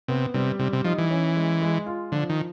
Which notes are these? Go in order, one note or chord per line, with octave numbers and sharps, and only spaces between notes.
C3 B3
C3 G3
C3 G3
C3
F3 D#4
E3
C#4
G#3
G#3
F4
D3 F3
D#3